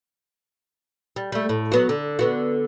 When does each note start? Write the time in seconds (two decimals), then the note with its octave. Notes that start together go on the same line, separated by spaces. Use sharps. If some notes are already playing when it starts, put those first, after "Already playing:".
1.16 G3
1.32 G3 A3
1.49 A2
1.72 F#3 B3 F#4
1.89 D3
2.19 D3 B3 F#4